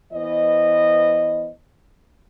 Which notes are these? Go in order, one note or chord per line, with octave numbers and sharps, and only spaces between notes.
E3 B3 C5 D#5